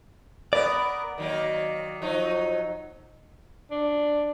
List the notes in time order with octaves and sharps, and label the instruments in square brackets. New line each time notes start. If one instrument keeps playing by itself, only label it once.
[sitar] B3 A#4 [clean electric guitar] D5
[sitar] D#3 F#3 A#3
F3 F#3 D#4
[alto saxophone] D4